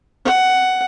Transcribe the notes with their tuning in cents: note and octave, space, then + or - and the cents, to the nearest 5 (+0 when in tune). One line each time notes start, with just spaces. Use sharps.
F#5 +10